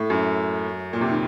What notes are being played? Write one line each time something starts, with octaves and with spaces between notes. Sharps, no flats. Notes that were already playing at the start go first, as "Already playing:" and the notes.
Already playing: A2
F#2
A#2
C3
D#3